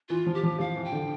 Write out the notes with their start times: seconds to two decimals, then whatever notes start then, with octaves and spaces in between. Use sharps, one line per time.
0.09 E3 F4
0.26 F3
0.34 G4
0.43 F3
0.60 F3 F5
0.76 E3
0.85 G5
0.92 D3